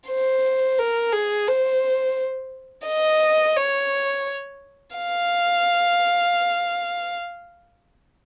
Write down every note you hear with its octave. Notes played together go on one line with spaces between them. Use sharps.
C5
A#4
G#4
C5
D#5
C#5
F5